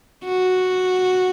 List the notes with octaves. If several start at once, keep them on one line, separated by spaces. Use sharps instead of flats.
F#4